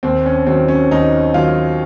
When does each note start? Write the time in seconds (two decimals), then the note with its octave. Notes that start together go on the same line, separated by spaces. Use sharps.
0.03 D#2 C4
0.26 C#4
0.47 D#3 F#3 C4
0.68 C#4
0.91 D#2 D#4
1.34 D#3 F#3 F4